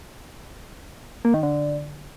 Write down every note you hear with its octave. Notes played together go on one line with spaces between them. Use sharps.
A#3
D#3
D3